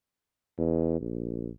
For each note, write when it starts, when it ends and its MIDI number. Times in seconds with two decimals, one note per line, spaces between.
0.58 0.98 40
1.01 1.50 34